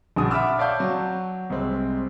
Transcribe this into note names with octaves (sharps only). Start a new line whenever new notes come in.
A#1 D4 F#4 D#6
E5 F#5 B5 D6 E6 F6
C#5 D5 F5 A5 D6 G6
F#3
C2 G#3 C4